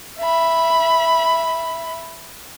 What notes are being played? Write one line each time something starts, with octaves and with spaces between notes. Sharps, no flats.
E5 B5